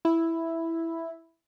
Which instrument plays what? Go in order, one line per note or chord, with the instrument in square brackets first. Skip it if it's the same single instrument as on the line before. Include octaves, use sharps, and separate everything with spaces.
[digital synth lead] E4